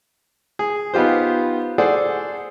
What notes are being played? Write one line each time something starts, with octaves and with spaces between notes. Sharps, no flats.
G#4
B3 D#4 F4 G4 C5
G#4 A4 C5 D5 F#5